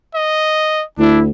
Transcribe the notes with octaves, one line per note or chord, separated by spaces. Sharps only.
D#5
D2 D4 E4